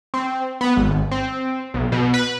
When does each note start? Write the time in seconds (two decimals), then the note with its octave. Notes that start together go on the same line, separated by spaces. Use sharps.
0.14 C4
0.61 B3
0.76 G#1
1.11 C4
1.74 B1
1.92 B2
2.14 B4